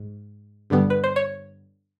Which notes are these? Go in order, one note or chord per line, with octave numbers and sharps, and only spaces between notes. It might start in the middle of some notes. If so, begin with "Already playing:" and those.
Already playing: G#2
G2 D3 G3 B3
B4
C5
C#5